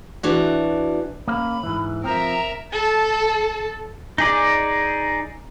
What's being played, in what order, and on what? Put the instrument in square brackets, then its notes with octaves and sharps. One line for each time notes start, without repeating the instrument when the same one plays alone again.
[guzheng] E3 D4 F#4
[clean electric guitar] A#3 C#4 F5 [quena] B5
[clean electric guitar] G#2 E3
[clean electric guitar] F3 C4 [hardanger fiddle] A#4 E5 [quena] A#5
[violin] A4 A5
[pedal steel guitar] D#4 G#4 D5